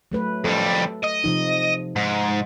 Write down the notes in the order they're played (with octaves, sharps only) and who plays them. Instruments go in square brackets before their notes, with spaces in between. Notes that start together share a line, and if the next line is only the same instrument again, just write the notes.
[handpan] F#3 A3 B4
[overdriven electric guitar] F2 G3 [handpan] A4
[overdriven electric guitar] D#5
[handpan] C3 F3 D#4
[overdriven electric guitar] G#2